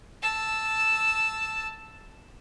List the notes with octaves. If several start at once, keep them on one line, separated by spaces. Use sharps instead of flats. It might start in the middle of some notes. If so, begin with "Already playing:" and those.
A5 E6